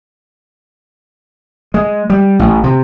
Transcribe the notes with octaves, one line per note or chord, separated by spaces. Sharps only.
G#3
G3
A1
C3